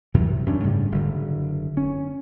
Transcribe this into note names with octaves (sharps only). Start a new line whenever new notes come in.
F#2 C3 E3
F#2 C#4 D4
G#2 C#3 G3 A3
F#1 D3
C#4